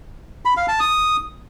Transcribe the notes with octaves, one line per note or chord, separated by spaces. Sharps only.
B5
F5
A5
D#6